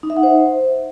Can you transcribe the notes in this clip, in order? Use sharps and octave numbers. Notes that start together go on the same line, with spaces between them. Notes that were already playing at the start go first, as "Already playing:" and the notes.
D#4
E5
F#5
C5